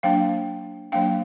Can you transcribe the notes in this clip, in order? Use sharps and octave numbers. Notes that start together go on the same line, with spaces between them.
F#3 A#3 D4 F5 G5
F#3 A#3 D4 F5 G5